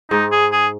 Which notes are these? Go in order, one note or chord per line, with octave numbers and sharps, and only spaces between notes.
G#2 D#4
G#4
G#4